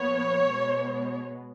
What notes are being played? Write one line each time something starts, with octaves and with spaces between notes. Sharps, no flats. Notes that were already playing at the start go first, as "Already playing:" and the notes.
Already playing: A#2 F3 B3 C#5
B2 G#3 B3